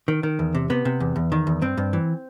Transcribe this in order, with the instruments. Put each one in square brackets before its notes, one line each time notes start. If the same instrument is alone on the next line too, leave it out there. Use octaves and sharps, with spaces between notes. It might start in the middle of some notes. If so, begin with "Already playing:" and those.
[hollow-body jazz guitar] D#3
D#3
E2
C3
C3 B3
C3
E2
E2
D#3
E2
G2 C4
G2
E3